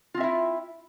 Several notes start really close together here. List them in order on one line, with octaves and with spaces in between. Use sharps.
F4 C4 E5 E4